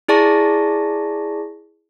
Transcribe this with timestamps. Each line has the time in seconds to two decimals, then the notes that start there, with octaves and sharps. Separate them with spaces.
0.08 E4 G#4 D5 A5 C#6 A#6